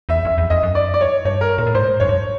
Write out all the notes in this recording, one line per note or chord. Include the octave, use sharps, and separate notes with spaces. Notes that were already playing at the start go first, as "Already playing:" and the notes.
E2 E5
F2 E5
E2
F2 D#5
F#2
D5
D5
C#5
G2 C#5
A#4
A#2 A#4
A2
G#2 C5
F#2 C#5
G2